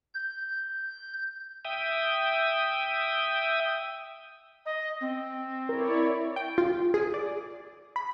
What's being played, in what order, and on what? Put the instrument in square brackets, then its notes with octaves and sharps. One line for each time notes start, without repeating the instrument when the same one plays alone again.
[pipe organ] G6
[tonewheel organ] E5 G5 D#6
[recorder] D#5
C4
[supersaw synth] E4 C#5 D5 [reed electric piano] A#4
[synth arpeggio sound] G5
F4
G#4
D5
B5